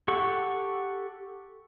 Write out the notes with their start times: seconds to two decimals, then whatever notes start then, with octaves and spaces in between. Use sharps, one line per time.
0.08 G4 A4 F#5 C#6